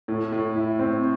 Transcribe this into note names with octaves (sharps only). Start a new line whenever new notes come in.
A2
A2
E4
C4